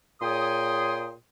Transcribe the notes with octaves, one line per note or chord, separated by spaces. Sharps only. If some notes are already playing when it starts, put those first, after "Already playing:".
A#2 G#4 C#5 G5 C6 D#6